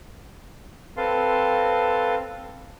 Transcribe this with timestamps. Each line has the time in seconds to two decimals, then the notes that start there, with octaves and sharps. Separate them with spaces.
0.97 C4 A4 B4 F5 A5 C6